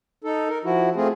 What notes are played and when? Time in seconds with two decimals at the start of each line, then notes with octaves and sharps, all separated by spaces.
0.24 D#4 A4
0.49 A#4
0.65 F3 E4 F#4
0.96 A3 C4 F4 G#4